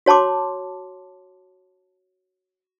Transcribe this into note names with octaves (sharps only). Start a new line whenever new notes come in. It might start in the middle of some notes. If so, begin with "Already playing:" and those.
F#4 C#5 A5 C6 D6